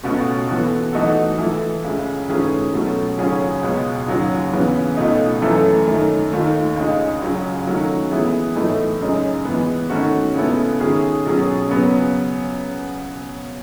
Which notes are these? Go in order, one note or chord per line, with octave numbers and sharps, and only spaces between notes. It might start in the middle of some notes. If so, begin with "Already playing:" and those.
C#2 B2 A3 C#4 F#4
E3 B3 F#4 A4
E3 A3 D#4 F#4 A4
E3 A3 E4 A4
C#2 C#3 G#3
G#2 E3 A3 C#4 G#4
B2 F#3 A3 C#4
D#2 C#3 F#3 C#4 G#4
C#2 B2 G#3
D#2 C#3 F#3
C#3 E3 B3
C#2 B2 A3 D#4
F#2 E3 A3 E4 A4
F#2 D#3 A3
D#2 D#3 A3
C#2 C#3 G#3 D#4
C#2 C#3 F#3
D#3 F#3 A3 C#4 F#4
E3 G#3 B3 E4 G#4
A2 E3 A3 D#4
F#2 C#3 G#3 D#4
E3 G#3 B3
D#3 A3 C#4 F#4
C#3 G#3 B3 E4 A4
D#3 G#3 C#4 G#4
B2 F#3 C#4 G#4
C#3 F#3 B3